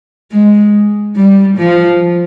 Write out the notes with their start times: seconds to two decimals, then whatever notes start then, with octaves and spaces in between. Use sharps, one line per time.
0.32 G#3
1.16 G3
1.58 F3